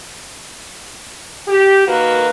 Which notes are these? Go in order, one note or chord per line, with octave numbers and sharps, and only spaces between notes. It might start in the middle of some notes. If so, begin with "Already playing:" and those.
G4
D#3 A#3 F#4 B4